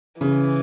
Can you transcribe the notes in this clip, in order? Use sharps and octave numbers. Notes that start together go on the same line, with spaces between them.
C#3 E3